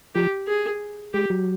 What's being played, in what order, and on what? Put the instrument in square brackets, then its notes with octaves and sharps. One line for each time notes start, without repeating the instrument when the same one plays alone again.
[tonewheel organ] F3 [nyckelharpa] G4
[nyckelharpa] G#4
[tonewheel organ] G#3 [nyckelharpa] G4
[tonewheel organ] F#3